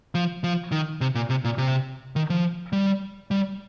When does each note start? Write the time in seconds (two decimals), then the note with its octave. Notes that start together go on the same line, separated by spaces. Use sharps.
0.15 F3
0.44 F3
0.72 D#3
1.01 C3
1.15 A#2
1.30 C3
1.44 A#2
1.58 C3
2.16 D#3
2.30 F3
2.73 G3
3.31 G3